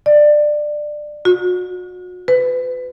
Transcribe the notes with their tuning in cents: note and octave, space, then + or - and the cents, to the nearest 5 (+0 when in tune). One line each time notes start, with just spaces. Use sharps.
D5 +20
F#4 -35
B4 +30